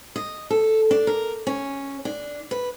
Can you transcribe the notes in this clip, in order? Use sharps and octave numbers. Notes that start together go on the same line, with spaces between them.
D#5
A4
D4
A#4
C#4
D4
B4